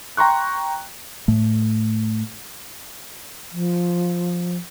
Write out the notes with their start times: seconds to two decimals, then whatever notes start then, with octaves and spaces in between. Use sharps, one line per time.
0.17 G5 A#5 C6 C#6 F#6
1.28 A2 A3
3.52 F3